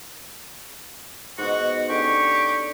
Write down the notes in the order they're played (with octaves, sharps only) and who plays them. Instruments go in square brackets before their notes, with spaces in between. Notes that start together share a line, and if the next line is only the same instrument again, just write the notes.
[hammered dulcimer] G#2 B2 [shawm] F#4
[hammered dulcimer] D3 C#4 [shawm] G4 [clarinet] C#6